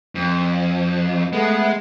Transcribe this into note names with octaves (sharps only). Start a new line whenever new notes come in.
F2
G#3 A3 B3